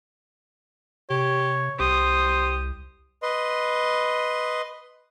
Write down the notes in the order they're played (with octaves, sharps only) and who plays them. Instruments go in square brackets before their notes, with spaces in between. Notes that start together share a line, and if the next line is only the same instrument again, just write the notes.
[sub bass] C3 [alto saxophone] G4 [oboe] C#5
[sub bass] C2 [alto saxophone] G4 [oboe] C5 [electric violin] D#6
[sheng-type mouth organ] B4 D#5 C6